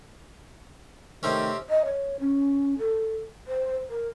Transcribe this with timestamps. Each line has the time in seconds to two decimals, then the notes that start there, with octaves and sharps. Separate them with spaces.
1.23 C3 D#3 A3 C4 C#4
1.70 D#5
1.85 C#5
2.20 C#4
2.78 A4
3.47 C5
3.90 A#4